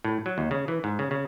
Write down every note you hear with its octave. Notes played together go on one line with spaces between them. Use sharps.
A2
F#3
D#2
C#3
E3
G#2
C#3
C#3